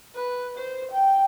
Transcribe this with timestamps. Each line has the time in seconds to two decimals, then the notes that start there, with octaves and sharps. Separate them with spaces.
0.15 B4
0.57 C5
0.91 G5